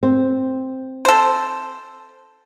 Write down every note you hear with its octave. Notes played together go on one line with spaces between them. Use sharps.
C4
A4 C5